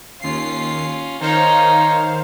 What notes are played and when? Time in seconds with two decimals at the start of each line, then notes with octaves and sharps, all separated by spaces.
0.22 D#2 C#4 F4 C7
1.21 D#3 D#4 C5 C#5 F5